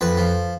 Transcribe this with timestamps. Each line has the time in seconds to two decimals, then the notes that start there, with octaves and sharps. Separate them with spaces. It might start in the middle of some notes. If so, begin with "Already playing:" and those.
0.01 F2 B4
0.17 F3